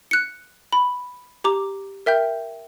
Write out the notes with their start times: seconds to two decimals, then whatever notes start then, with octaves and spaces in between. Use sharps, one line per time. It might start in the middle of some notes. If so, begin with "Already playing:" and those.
0.11 F#6 C#7
0.73 B5
1.44 G4 A#5 D6
2.06 A#4 E5 G5 G6